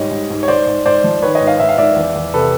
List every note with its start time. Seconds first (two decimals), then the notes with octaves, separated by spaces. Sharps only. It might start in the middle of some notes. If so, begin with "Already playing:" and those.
Already playing: G#2 G3 C#5 D#5
0.11 G#2
0.30 G#2
0.43 C#5
0.48 G#2 C5 D5
0.66 G#2
0.86 G#2 C5 D5
1.04 F3
1.22 D#3 B4 C#5
1.35 C#5 D#5
1.41 G#2
1.47 D#5 F5
1.59 G#2 E5
1.69 F5
1.78 G#2 D5 E5
1.96 E2
2.15 E2
2.34 C3 A4 B4